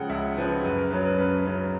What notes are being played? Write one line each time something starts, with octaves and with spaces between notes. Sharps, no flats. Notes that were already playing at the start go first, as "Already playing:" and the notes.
Already playing: C#3 F3 G#3 F#5 G5
C#2 E5
C#3 F3 G#3 B4
F#2 B4
A#4
C#3 F#3 B4
B4
F#2 B4
C#3 F#3 B4